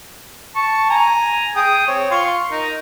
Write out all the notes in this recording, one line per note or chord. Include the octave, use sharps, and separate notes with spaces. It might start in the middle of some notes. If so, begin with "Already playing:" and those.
A5 C#6
G#5 A#5
G#4 G5 D#6
C4 C#5
F4 C6 C#6
D#4 A#4